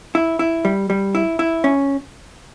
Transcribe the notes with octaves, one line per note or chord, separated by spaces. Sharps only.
E4
E4
G3
G3
E4
E4
C#4